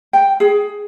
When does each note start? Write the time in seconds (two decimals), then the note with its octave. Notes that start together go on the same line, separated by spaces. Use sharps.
0.13 G5
0.40 G#4